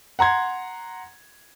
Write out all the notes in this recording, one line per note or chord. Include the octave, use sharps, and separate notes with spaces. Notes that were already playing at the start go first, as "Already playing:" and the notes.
F#5 A#5 C6 G#6